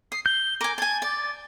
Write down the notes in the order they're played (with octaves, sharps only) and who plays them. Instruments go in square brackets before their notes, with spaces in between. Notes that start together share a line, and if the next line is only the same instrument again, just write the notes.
[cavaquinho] D#6 [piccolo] C7
[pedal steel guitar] G6 [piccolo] G7
[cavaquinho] A#4 G#5 [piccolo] D6
[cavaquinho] G#5 A5 [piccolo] G#6
[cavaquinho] D5 [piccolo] A6